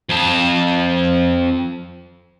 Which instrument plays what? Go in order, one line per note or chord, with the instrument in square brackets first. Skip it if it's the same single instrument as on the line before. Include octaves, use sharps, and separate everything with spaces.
[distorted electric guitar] F2 A5